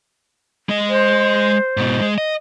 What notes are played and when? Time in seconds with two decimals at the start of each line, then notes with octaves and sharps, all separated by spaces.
0.69 G#3 D#5
0.89 C5
1.77 G#2 B2
2.01 G#3
2.18 D#5